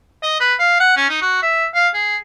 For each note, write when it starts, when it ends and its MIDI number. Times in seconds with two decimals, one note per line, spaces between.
0.23 0.38 75
0.40 0.55 71
0.60 0.76 77
0.80 0.96 78
0.97 1.09 61
1.09 1.18 63
1.22 1.41 66
1.42 1.66 76
1.75 1.88 77
1.94 2.17 68